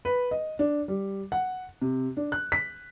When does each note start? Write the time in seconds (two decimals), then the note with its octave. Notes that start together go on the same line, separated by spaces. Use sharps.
0.05 B4
0.31 D#5
0.59 D4
0.88 G3
1.32 F#5
1.82 C3
2.17 D4
2.32 F#6
2.52 B6